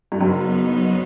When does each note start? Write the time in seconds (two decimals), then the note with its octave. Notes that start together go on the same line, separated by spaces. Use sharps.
0.12 G2
0.21 F#1 F#2 F#3 B3 D#4